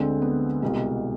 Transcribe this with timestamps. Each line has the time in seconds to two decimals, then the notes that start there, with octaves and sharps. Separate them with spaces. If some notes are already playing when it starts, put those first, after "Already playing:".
Already playing: D2 D3 G#3 C4
0.22 B3
0.62 C2 B2 G#3